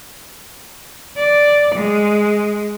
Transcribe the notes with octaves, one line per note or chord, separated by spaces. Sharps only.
D5
G#3